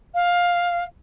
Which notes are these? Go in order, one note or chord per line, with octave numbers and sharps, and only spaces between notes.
F5